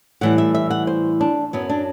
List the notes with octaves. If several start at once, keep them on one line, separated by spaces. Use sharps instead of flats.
A2 E3 G3 F#5
E5
E5
F#5
C5
D4
F#2 F#3 B3
D4